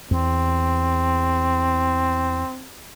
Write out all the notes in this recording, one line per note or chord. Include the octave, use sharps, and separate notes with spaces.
E2 C4